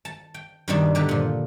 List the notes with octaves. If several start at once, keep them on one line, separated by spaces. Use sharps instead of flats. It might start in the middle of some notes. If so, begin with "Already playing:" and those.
A5
G5
G2 B2 D#3 G3 D4 D#4
D3 G4 B4 A#5
A#2 F3